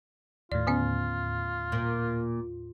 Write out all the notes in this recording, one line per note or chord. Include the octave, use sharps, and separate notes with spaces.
D#2 A2 F4 D5
D3 B3 C#4
A#2